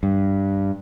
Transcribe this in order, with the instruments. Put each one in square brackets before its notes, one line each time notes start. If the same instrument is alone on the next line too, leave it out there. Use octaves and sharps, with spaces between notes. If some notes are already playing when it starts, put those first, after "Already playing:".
[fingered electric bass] G2